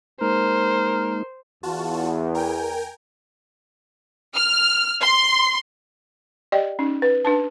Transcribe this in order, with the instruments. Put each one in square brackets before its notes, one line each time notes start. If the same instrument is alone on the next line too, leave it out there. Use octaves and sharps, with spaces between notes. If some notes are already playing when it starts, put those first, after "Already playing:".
[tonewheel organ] G#3 A#3 D#4 [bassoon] A#4 [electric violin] C5
[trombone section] E2 [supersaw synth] F4 F#4 A5
[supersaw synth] A#4 G5 G#5
[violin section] F6
C6
[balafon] G4 D5 D#5 G5
C#4 D#4
B4
D4 B4 A5